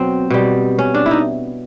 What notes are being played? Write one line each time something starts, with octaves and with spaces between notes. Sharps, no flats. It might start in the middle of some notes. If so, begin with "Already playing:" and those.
Already playing: B2 F#3 C4
B2 G3
C#4
D4
E4
D#4